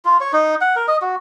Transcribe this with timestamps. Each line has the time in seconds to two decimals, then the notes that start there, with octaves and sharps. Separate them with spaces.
0.05 F4
0.20 C#5
0.33 D#4
0.61 F#5
0.76 A#4
0.88 D#5
1.02 F#4